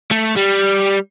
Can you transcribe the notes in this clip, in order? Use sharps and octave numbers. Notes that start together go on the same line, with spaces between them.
A3
G3